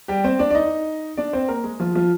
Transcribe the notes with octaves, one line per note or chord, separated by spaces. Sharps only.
G3 G4
C4 C5
D4 D5
D5
D#4 D#5
D4 D5
C4 C5
A#3 A#4
G#3 G#4
F3 F4
F3 F4